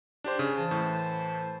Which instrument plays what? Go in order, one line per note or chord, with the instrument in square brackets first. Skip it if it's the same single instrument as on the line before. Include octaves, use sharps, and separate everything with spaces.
[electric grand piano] D4 G4 C5
C#3
[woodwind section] E3 C5 A5
[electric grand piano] A2